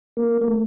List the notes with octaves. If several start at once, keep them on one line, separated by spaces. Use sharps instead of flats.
A#3
A#3
A3